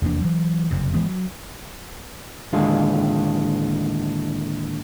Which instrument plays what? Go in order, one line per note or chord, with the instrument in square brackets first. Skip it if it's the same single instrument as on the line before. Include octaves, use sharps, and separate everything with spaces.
[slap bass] F1 E2 A#3 D4
E3 F#3
F#1 F2 C3
G#1 E3 G#3 B3
F#3
[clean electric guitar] D#2 A2 D3 G#3 F4